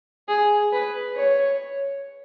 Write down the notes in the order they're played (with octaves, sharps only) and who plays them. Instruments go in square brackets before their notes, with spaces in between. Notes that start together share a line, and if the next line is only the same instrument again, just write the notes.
[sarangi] G#4
B4
C#5